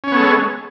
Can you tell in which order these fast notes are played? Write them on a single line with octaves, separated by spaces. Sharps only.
C#4 C#5 B3 A4 G#3